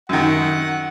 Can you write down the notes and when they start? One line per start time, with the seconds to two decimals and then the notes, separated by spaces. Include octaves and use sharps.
0.09 F#2 D#3 F#5